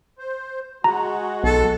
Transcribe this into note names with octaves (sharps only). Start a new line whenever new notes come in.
C5
G#3 F#4 A#5
B1 A4